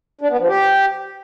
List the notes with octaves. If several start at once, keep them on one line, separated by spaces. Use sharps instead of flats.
D4
B3
F3
G4